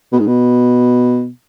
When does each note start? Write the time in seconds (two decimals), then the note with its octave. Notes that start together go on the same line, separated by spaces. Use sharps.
0.12 B2
0.19 G#2
0.27 B2